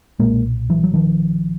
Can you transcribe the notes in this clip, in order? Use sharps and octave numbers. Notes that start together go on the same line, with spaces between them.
B1 A#2 G#3 A#3
E3 F#3
F#3
D#3 F3